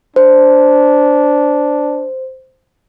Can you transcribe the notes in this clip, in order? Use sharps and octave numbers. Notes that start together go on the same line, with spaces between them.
D4 C5